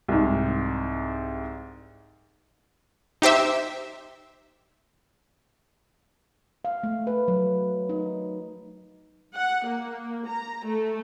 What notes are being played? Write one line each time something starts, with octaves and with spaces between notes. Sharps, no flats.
C2 G#2
D#4 G4 C5 E5
F5
A3
B4
F#3
D#4
F#5
A#3
A#5
A3